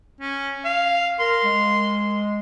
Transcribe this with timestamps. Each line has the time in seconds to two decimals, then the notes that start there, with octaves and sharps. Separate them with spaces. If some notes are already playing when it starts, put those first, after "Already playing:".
0.20 C#4
0.65 F5
1.20 A#4 C6
1.44 G#3